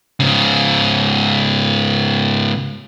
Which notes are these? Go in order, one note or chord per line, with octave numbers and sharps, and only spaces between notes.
G#2 C#3